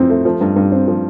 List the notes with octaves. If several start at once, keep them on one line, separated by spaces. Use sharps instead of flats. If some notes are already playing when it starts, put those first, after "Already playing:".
Already playing: F2 E3 C4
A3
F3
G2
G2
C4
F3